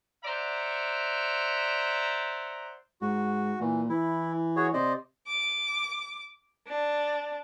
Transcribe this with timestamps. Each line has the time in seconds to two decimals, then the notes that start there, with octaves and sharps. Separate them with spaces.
0.24 C5 D5 E5 F#5 A#5
3.01 G#2 F#4
3.60 A#2 E3
3.89 E3 E4
4.56 F#4 G#4 C#5
4.73 C3 C5 D5 D#5
5.27 D6
6.67 D4